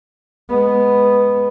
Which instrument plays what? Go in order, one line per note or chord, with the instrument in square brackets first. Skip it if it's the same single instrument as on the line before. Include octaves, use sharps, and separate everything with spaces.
[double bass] G#3 B3